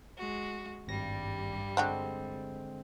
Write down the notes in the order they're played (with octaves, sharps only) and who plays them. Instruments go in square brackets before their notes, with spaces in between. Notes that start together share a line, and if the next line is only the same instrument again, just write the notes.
[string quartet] G#3 F#4
[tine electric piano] G#1 A#6 [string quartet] G2 G3
[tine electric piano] D3 G#3 C4 [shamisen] D4 F#4 G4